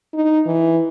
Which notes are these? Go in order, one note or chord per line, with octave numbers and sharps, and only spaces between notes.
D#4
E3